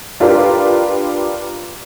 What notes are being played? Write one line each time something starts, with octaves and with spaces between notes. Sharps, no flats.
D4 F4 G4 A#4 B4